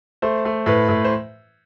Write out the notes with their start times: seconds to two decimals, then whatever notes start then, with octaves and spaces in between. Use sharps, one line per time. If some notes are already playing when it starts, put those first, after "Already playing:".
0.22 A3 C5
0.45 A3
0.66 A2 B4
0.89 A2
1.04 C5